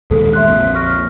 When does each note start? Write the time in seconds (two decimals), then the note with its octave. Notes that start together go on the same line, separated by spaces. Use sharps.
0.11 D#2 A#2 G#3 A4
0.33 E5 C6 F#6
0.47 A#1 F2
0.75 C#6 F6 A#6